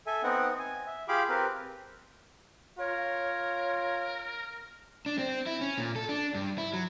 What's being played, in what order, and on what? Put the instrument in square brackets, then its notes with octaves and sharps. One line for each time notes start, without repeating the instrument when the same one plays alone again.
[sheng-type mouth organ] A4 E5 G#5
B3 C4 D#4 F#5
G#5
E5
F4 G4 G#4 F5 B5 D6
C4 G4 A#4 B4
[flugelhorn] F4 [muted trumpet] A#4 [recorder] C#5
[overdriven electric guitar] D4
C4
E4
C#4
A#2
A4
D4
G2
E4
F#3